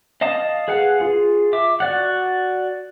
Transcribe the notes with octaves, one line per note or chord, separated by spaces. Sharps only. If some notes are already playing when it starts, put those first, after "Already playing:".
D#5 F5 A5 D#6
G#4 B4 F5 F#5
F4 G#4
E5 D6
F#4 D5 F#5